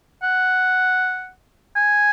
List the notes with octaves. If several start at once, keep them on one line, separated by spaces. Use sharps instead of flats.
F#5
G#5